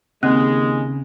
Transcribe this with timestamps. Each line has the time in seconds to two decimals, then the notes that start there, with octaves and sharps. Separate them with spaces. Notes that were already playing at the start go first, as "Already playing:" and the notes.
0.23 D#2 C#3 G#3 C4